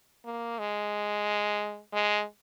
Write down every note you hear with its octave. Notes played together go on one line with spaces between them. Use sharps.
A#3
G#3
G#3